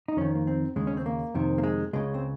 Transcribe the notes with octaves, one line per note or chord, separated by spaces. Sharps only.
D#4
F2 D#3 C#4
A#3
C4
D#2 C#3 G#3
C#4
C4
A#3
F2 C3 D#3
A#3
G#3
C#2 C#3 G#3
C4